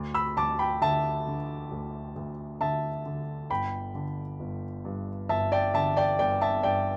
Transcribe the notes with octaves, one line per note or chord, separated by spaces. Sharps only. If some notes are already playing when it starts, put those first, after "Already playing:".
Already playing: D2
B5 E6
D2 A5 D6
G5 B5
D3 E5 A5
D3
D2
D2
D3 E5 A5
D3
G1 G5 B5
D3
G1
G2
G1 E5 A5
D5 G5
D3 E5 A5
D5 G5
G1 D5 G5
E5 A5
G2 D5 G5